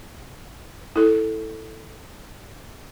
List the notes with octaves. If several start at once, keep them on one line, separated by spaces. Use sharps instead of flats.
E4 A4